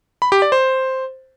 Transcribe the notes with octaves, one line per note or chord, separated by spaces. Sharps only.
B5
G4
D5
C5